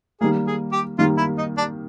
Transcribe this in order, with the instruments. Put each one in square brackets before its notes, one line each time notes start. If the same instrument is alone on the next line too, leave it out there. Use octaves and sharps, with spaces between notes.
[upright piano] D#3 G3 A#3 [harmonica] G#4
[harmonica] G#4
G4
[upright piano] D#3 G3 A#3 [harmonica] F4
[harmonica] E4
D#4
D4